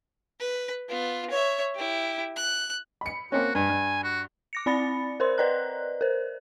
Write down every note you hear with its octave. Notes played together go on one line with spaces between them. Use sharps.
B4
B3 F4
C#5 E5
E4 G4
F#6
B5 C#7
A#3 C4 C#4 F#4
G2 G#5
G2
F#4
D6 A#6 C#7
C4 D5 B5 A6 C#7
A#4 C5 C6
B4 D5 D#5 A#5 F#6
A#4 C5